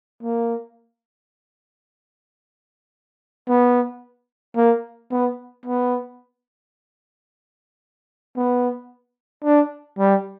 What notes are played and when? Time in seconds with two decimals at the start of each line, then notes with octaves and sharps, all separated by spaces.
0.23 A#3
3.48 B3
4.56 A#3
5.11 B3
5.65 B3
8.37 B3
9.44 D4
9.99 G3